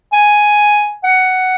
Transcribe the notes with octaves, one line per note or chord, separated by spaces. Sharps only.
G#5
F#5